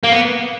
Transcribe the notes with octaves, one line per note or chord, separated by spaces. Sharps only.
A#3
B3